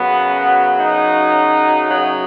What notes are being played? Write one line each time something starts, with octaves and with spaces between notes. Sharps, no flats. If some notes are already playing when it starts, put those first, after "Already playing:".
Already playing: F#2 C#3 F#3 B3
D#4
F#2 C#3 F#3